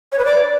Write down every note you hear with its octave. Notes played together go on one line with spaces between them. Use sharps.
C#5
B4
D5